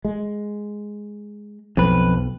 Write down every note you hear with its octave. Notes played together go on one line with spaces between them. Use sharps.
G#3
B1 F2 B4